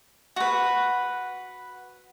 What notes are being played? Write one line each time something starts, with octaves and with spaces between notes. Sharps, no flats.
F#4 B4